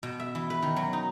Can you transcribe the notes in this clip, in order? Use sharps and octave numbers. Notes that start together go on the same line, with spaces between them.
B2
E5
E3
B4
D#3
F#3
D#4